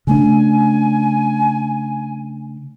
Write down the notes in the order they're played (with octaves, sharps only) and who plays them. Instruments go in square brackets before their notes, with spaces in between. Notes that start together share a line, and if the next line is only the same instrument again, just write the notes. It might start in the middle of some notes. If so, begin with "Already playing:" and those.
[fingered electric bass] C#3 A3 D4 [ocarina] G#5